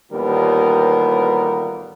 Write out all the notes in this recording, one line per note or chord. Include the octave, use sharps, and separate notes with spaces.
A1 D#2 G3 B3 F4 A#4